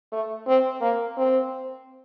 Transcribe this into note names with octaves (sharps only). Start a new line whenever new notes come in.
A3
C4
A#3
C4